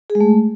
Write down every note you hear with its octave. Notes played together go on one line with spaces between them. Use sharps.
G#4
G#3
A3